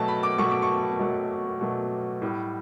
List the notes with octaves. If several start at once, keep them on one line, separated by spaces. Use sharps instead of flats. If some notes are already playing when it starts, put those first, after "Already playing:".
Already playing: B2 F#3 A3 A5
B5
D6
B2 F#3 A3 C#6
D6
C#6
B2 F#3 A3
B2 F#3 A3
A2 G3